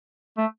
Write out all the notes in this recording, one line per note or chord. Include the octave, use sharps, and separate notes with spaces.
A3